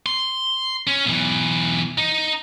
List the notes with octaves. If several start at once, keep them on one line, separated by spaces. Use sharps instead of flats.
C6
C#4
B1 E3
D#4